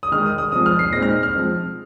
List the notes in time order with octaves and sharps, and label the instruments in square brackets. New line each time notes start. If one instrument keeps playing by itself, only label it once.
[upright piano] D#6
D#3 G#3 D#4 F6
D#6
D#6
F3 G#3 C4 D#6
F6
C7
A#2 G#3 C4 D#4 A#6
F6
F6
F3 G#3 C4